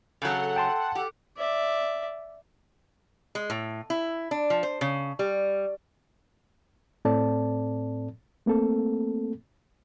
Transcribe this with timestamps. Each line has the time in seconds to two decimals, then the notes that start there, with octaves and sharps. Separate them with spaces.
0.22 C#3 F#3 A4 F#5
0.56 G5 A5 C6
0.95 G4
1.37 D5 E5
3.35 G#3
3.50 A2
3.90 E4
4.31 D4
4.50 F3
4.63 C5
4.81 C#3
5.19 G3
7.05 A2 C4 A4 D5 A5
8.46 A3 A#3 C4 A4